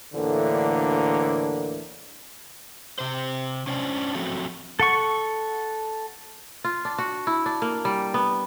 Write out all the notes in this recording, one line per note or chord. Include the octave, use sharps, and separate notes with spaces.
D2 A2 D3 E3 A#3
C3 C5
C#4 D4 C5 D5
F3 F#3 A3 C4 F#4
A4 F#5 C#6
F4
D4
F#4
E4
D4
A#3
G3
B3